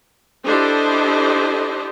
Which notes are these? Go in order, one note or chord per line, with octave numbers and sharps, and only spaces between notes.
D4 E4 G4 A4 C5 D#5